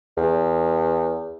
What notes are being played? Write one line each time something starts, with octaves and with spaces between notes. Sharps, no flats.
E2